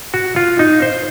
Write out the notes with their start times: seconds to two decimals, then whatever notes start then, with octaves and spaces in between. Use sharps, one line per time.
0.14 F#4
0.36 F4
0.59 D#4
0.82 C5